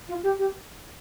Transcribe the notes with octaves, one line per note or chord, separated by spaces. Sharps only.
F4
G4
G4